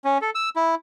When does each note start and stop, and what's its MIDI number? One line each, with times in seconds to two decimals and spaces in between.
0.05 0.18 61
0.22 0.30 69
0.35 0.49 88
0.56 0.75 64